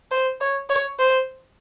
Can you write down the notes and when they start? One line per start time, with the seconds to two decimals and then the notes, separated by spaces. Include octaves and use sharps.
0.11 C5
0.41 C#5
0.70 C#5
0.99 C5